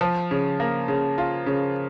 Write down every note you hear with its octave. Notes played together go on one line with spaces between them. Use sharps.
F3
C#3
A#3
C#3
F4
C#3